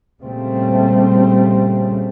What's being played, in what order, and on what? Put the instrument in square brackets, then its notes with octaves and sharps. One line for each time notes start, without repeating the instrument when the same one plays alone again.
[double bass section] A#2 C#3 G3 A3 C4